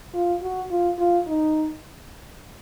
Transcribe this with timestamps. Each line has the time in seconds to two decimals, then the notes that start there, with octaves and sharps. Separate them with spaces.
0.14 F4
0.42 F#4
0.71 F4
0.99 F4
1.27 D#4